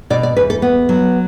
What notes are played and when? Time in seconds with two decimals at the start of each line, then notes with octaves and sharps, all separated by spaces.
0.10 B2 D5
0.23 D5
0.37 E2 B4
0.50 A4
0.62 B3
0.89 F#3